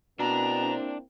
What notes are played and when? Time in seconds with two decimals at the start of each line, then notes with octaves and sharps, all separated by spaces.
0.19 B2 A#3 C4 D4 E4 D5 A#5